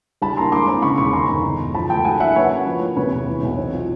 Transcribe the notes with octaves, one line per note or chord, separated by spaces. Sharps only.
G3 A5 B5
A#3 A#5 C6
G#3 C6 D6
C4
C#3 B5 C#6
E1 B5 C#6
D#3 A#5 C6
G1
D3
E1
F3 A5 B5
A3 G5 A5
F#3 F#5 G#5
A#3 E5 F#5
A#3 B4 C#5
C#4
F3
A#3
C3 B4 C#5
E1
E3
B1
C4
F4